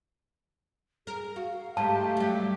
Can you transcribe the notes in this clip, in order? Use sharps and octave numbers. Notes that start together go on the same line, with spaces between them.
G#4 A#4
F#4 F5
G#2 A3 G4 A5
F#3 G3